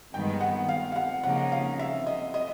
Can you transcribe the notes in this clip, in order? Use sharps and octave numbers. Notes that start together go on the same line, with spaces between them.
G2 D#3 G#3 B3 G5
F#5
F5
F5
F#5
C#3 F3 A#3 D#4 F#5
F5
E5
D#5
D#5